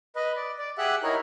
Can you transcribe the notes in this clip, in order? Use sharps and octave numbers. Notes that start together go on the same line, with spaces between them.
B4 D#5
D5
D5
G4 G#4 E5 F#5 F#6
D#4 E4 A#4 C#5